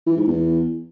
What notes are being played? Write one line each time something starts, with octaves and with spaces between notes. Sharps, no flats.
E3
G#2
E2